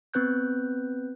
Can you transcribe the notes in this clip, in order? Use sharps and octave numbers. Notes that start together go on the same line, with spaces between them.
B3 C4 B4 F#6 G6